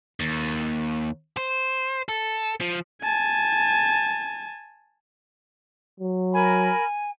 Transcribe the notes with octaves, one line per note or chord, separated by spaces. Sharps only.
D#2
C5
A4
F3
G#5 A5
F#3
A#4 G#5 B5